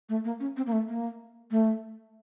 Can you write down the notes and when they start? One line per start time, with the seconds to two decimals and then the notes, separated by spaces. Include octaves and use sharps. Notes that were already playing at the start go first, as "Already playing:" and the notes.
0.09 A3
0.25 A#3
0.40 C#4
0.57 C4
0.67 A#3
0.72 A3
0.88 A#3
1.51 A3